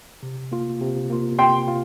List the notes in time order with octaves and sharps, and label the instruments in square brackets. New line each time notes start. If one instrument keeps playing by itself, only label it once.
[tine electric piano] C3
A#3 F4
C3
A#3 F4
[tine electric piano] C3 [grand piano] G5 C6
[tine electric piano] F4